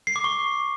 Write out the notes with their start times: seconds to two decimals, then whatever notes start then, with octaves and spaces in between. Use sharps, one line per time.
0.07 C7
0.16 D6
0.24 C#6